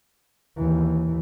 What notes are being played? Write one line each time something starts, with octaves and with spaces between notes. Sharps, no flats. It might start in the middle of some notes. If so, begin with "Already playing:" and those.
D#2 E3